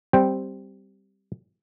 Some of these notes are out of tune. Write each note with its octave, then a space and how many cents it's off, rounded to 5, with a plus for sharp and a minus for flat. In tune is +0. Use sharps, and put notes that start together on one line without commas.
G3 +0 C4 +0 G5 +0